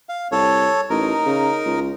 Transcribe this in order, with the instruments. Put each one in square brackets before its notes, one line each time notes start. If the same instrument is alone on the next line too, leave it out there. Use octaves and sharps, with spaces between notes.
[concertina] F5
[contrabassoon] C2 [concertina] A4 C#5
[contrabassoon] A1 [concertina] D#4 A#4
[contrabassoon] C#3
C#2